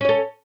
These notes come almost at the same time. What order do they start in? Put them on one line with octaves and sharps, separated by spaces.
C#4 C#5 A4